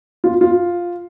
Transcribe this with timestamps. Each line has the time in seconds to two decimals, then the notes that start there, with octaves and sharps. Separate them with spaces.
0.24 F4
0.41 F4